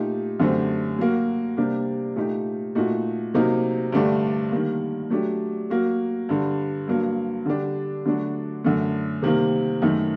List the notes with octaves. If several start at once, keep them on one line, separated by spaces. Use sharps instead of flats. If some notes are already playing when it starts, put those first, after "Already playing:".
Already playing: A#2 A3 D#4 G4
F#2 D3 A3 C4 G4
F#3 A#3 F#4
C3 G3 A#3 D4 G4
A#2 A3 D#4 G4
A#2 A3 D#4 F#4
C3 F#3 A#3 D#4
G2 D3 A3 D4 G4
D#3 G3 A#3
F#3 A3 D4 G4
F#3 A#3 F#4
G2 D3 G3
G2 F#3 A#3
D3 G3 D4 G4
D3 F#3 A3 D4 F#4
F#2 D3 A3
C3 D#3 G3 A#3
F#2 D#3 A3 D#4